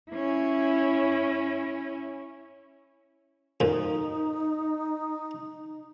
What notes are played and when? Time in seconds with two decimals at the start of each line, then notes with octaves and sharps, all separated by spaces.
0.11 C#4 E4
3.60 F2 A#2 D#4